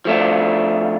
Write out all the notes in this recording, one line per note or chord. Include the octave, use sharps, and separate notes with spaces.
F3 A3 D4